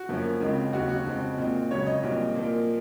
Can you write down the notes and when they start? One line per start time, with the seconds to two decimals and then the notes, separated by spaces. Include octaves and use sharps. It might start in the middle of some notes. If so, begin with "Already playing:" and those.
Already playing: F#4
0.09 F#2 F3 A#3 C#4
0.40 C#2 C#3 G#3 C4
0.73 D#2 C#3 F#3 F#4
0.89 F#4
1.06 F2 C#3 G#3 C4
1.38 A#2 G#3 C4
1.70 C#2 C#3 F#3 C#5
1.87 D#5
2.03 C2 A#2 F#3 C4
2.35 A#2 F3 A#3